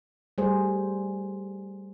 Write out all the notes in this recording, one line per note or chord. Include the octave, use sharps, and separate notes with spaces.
G3 A3 G#4 C5